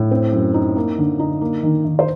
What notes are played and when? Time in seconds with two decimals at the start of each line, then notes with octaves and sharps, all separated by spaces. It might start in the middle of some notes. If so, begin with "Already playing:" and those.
Already playing: A2
0.11 C4
0.33 F#2
0.54 D#4
0.76 A#3
0.98 D3
1.19 D#4
1.41 A#3
1.63 D#3
1.85 D#3
1.99 C5